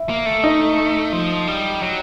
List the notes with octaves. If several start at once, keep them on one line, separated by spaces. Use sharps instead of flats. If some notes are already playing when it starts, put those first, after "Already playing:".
Already playing: E4
A#3
A3
D#4
F3
G3
F#3